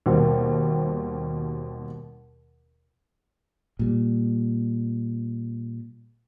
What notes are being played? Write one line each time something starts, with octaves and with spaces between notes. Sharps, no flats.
D#2 B2 G3 C4
A#2 G3